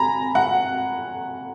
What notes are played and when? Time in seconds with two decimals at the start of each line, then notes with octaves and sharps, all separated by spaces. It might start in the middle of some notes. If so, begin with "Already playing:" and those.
Already playing: G#5 A#5 B5
0.35 F#5